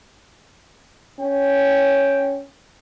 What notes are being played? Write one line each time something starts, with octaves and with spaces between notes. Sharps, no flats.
C#4 G5